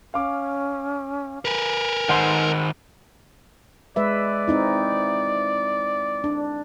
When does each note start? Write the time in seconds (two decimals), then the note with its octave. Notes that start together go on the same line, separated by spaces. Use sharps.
0.14 C#4 F5 D6
1.45 A#4 B4 G#5
2.09 D#3 C5 F#5 C6
3.96 G#3 B4 D5 E5
4.48 C4 D#4 E4
6.24 D4